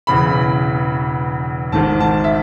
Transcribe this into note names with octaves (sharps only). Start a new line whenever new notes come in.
E1 E2 C#3 E3 B5
G#1 G#2 D#3 A5
A5
E5